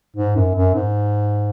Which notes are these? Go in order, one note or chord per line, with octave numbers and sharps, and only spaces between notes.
G#2
F#2
F#2
G#2